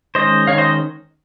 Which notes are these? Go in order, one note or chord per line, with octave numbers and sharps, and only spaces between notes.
D#3 G#3 C#4 C5 D#5
D#3 G#3 C#4 C#5 F5
C5 D#5